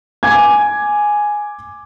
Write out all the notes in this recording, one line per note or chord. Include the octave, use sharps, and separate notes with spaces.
G#5 D6 G#6